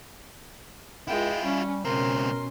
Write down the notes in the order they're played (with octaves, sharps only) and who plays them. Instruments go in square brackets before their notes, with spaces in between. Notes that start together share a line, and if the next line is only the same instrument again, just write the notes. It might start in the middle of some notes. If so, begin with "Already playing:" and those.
[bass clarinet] C#2 [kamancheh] G#3 G5 [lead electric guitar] E4 F4
[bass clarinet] G3 [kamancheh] C#4
[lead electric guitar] C#2 C4 [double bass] B2 C#4 [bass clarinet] A#4 [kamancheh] C6